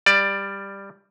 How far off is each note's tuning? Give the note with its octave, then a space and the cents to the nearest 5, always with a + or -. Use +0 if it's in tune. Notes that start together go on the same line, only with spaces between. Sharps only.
G3 +10 D5 +10